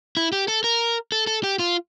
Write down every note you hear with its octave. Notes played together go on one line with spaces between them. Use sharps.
E4
G4
A4
A#4
A4
A4
G4
F4